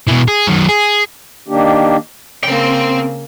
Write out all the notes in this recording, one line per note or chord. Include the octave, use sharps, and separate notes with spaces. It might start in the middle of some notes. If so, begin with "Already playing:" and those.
B2 E3
G#4
F#2 D#3
G#4
D#3 A#3 D4 G4
C#3 A#3 C4 G5